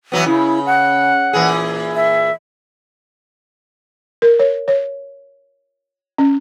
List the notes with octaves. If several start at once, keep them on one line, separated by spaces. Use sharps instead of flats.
E3 F#3 B3
C#3 E4
F#5
A#2 E3 G#4
E5
A#4
C#5
C#5
C#4